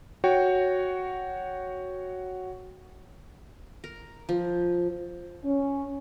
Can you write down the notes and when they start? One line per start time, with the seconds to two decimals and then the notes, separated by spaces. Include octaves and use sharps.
0.24 F#4 C#5 G5
3.84 A#4
4.29 F3
5.44 C#4